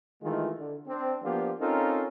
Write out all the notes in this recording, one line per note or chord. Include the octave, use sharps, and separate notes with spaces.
D#3 E3 G#3 A3 F4
D3
C4 D4
F3 A#3 B3 D4 F4 G4
C4 C#4 D#4 F4 A4 A#4